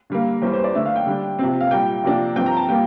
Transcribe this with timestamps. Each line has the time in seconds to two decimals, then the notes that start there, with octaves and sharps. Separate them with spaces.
0.10 D3 G3 A#3
0.42 E2 E3 G3 C5
0.53 C5
0.64 D5
0.75 D3 A3 D4 E5
0.85 F5
0.96 G5
1.06 D3 G3 D4
1.39 C3 F3 C4
1.61 F5
1.71 A#2 G3 A#3 G5
2.03 C3 F3 A#3 D4
2.36 G2 F3 C4 G5
2.46 A#5
2.57 A5
2.68 A#2 G3 A#3 G5